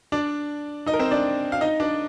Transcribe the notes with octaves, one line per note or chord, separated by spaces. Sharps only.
D4 D5
D#4 D#5
A#4
C4 C5
D4 D5
F5
D#4 D#5
D4 D5